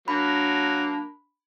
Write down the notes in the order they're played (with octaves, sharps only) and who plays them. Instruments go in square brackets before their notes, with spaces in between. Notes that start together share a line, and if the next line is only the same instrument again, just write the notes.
[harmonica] F#3 A#3 [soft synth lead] D4 [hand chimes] B5